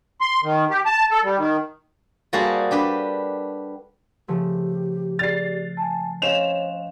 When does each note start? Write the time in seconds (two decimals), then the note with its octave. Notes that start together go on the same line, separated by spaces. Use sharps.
0.21 C6
0.44 D#3
0.71 G4
0.86 A5
1.11 A4
1.24 G3
1.38 D#3
2.33 G3 A#3 F#4 G#4 A4 C5
2.71 D4 G4 B4
4.28 C#3 F3 A3 G4
5.19 G#4 D5 A6 C7 F7
5.77 G#5 A5
6.22 C#4 C5 C#5 D#5 F5 C7 E7 F7